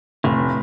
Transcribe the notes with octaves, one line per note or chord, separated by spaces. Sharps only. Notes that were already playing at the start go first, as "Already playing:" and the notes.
F1 A2